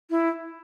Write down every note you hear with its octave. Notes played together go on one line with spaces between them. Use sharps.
E4